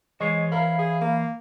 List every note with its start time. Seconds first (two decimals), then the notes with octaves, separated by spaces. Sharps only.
0.20 E3 G#3 C5 C#5 D#5 C#6 D#6
0.52 A#4 E5 F5 B5
0.79 G#4
1.01 A#3